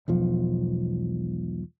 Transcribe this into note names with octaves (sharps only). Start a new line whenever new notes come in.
E1 B1 F3